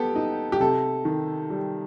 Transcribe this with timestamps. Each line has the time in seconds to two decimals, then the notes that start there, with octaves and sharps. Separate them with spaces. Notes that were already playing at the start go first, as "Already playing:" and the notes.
Already playing: B3 G4 A4
0.16 D#4
0.52 G4
0.60 C3 A4
1.05 D#3
1.50 G3